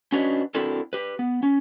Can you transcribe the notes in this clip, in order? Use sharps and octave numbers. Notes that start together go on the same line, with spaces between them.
C#4 D4 F#4 B4 C#5 D#5
C4 D4 E4 F#4 A4 A#4
G4 B4
B3
C#4